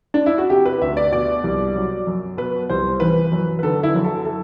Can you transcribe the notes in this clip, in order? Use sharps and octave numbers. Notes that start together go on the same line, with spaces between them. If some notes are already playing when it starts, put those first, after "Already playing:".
D4
E4
F#4
C3 G4
B4
D2 E5
D5
B2 D5
C2
F#3
F#2
B2 B4
C2 C5
E3 B4
F#2
B4
D3 A4
E4
F#2
A4
A4